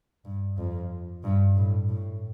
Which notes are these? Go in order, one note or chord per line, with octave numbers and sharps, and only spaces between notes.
G2
F2
G2
A2
A2